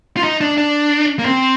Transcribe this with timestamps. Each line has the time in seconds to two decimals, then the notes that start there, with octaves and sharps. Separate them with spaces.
0.17 F4
0.24 D#4
0.41 D4
0.58 D4
1.19 A#3
1.25 C4